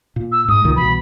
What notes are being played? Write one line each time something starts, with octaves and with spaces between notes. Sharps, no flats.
A#2
E6
G#2 D#6
C#2 A#2 D#3
C2 B2 E3 B5